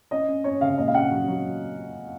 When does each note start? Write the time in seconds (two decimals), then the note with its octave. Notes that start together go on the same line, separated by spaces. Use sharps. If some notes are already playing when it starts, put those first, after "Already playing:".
0.11 C#4 D#5
0.28 C#4
0.44 C#4 C#5
0.61 C#3 F5
0.78 A#2 D#5
0.88 F5
0.94 C#4 F#5
1.11 F#3
1.28 F#3